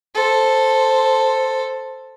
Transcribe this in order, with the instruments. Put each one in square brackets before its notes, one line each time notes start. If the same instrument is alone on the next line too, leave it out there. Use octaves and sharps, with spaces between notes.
[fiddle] A4 C5